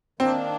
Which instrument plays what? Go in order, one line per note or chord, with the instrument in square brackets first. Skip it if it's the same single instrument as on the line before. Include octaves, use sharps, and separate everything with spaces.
[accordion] D#3 A#3 D4 [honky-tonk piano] C4